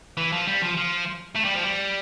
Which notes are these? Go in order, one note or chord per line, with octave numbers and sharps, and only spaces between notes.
E3
F3
G3
F3
F3
A3
G3
F3
G3